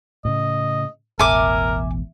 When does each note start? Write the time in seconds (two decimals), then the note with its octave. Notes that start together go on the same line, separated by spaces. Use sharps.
0.25 A2 C#3 D#5
1.19 E1 A1 E2 A#4 E5 G#5 D6